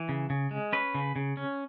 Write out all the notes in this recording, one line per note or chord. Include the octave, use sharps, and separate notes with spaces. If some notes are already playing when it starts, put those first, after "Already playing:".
Already playing: E3
C#3
C#3
G#3
C#4 B4
C#3
C#3
C#4